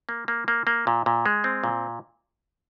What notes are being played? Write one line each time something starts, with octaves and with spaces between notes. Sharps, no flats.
A#3
A#3
A#3
A#3
A#2
A#2
G#3
C4
A#2